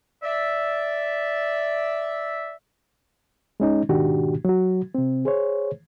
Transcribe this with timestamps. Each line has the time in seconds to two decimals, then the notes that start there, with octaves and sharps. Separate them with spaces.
0.23 D5 E5
3.60 G#3 C#4 D#4
3.89 G#2 B2 D#3 D4 F#4 G4
4.45 F#3 F#4
4.95 C3 C4
5.25 G#4 C5 C#5